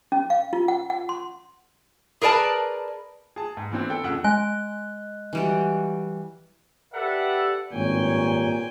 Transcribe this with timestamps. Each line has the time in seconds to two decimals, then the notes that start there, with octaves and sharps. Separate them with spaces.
0.12 C#4
0.30 F5
0.53 F4
0.68 F#5
0.90 F#5
1.09 C6
2.22 G#4 A#4 B4 D5 A5
3.36 G#4 A5
3.57 G#2
3.72 E3 B3 C4 D4
3.90 A4 G5
4.04 F2 C#3 F#5 E6
4.24 G#3 D#5 G#5 F#6
5.33 E3 G3 F#4
6.94 G4 A4 B4 D5 E5 F#5
7.73 G#1 G2 A#2 C#5 G5 G#5